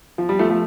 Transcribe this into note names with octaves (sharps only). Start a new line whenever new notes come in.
F3
G3
F3 A3
F3 A3